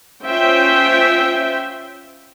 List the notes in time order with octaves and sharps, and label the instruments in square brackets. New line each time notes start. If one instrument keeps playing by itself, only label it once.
[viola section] C#4 F4 C5 E5 G5